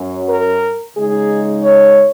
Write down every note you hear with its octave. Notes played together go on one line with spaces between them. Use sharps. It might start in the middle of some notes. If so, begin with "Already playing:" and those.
Already playing: F#2 F#3 C#4
A#4
C#3 G#3 D#4 G#4
C#5